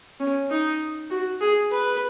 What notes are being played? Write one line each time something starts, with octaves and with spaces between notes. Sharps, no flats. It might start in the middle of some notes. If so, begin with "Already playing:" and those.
C#4
D#4
F#4
G#4
B4